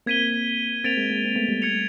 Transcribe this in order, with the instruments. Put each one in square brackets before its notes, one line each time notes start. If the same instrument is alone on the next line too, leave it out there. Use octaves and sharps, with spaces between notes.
[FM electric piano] A#3 C4 [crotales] G#6 B6 D#7 G7
[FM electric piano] A#3 C4 [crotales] A6 D7 F7
[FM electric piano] G#3 A#3
G#3 A#3
C4
A3 B3
G3 A3
[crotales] G#6 C#7 F7